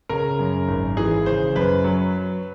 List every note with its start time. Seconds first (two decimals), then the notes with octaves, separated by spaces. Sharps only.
0.09 C#3 A#4
0.39 F#2
0.68 G#1
0.97 E3 G#4
1.26 C#3 C5
1.56 F#2 B4
1.84 F#3